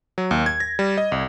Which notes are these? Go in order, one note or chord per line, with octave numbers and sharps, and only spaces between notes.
F#3
D#2
G#6
A#6
G3
D#5
C2